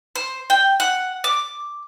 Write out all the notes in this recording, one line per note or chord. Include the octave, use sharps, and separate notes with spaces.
C5
G5
F#5
D6